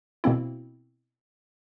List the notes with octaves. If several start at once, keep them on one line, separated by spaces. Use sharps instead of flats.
B2 A#3 C4 E4